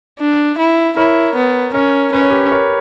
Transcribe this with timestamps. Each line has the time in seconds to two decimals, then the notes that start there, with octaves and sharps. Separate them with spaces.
0.20 D4
0.59 E4
0.96 E4 A#4 C#5
1.35 B3
1.74 C#4 A#4 C#5
2.13 C#4 B4
2.21 C#5
2.30 G4 B4
2.52 A#4 C#5